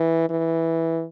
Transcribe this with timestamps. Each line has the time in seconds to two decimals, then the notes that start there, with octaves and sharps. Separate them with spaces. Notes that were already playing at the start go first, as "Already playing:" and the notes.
Already playing: E3
0.30 E3